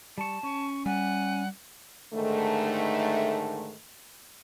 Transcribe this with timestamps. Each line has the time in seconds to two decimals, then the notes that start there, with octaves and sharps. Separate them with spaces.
0.18 G3 A5 C#6
0.43 C#4 C#6
0.86 G3 F#5 G#5
2.14 G#2 D3 D#3 A3